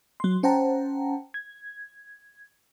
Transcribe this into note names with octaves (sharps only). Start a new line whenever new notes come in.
F#3 C6
C#4 C5 F#5 G5 A5 A#5
G#6